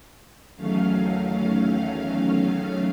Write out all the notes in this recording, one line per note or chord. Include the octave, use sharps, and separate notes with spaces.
E2 D#3 F#3 A3 C#4 F5